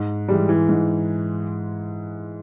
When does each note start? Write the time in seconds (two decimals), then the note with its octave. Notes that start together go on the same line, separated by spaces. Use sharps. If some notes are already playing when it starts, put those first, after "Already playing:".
Already playing: G#2
0.28 E3 G3 G#3
0.49 E3
0.69 G#2